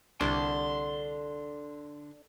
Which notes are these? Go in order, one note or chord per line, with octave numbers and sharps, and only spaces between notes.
C2 D3 D4 C6